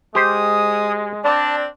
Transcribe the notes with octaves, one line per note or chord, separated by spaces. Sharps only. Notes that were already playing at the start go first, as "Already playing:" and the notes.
G#3 G4 C5 D#6
C4 D4 D5 A5